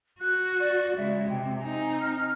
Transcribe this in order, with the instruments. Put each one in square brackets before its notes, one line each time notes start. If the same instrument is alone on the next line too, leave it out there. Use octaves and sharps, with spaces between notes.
[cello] F#4 [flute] F#6
[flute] D5
[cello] C#3 G#3 [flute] E5
[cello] C3 [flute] G5
[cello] C4 D#4 [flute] G#5
[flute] F6